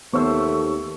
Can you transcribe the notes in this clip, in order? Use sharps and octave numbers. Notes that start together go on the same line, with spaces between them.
D#2 A3 B3 C5 C#5 C#6 E6